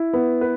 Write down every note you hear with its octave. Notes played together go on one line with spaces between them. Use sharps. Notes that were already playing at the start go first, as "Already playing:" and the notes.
Already playing: E4
B3
B4